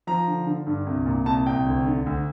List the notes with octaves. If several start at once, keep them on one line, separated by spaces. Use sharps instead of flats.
F3 A#5
D3
D3
G2
C2
A#2
C2 A5
C2 G5
D2
D3
D2